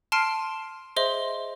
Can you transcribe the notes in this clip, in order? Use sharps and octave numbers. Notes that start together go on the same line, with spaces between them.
A5 C6 F6 C7 D7 D#7
G#4 C5 D#5 E5 C6 G7